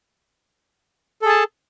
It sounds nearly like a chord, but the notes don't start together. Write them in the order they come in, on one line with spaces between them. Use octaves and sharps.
A4 G#4 A5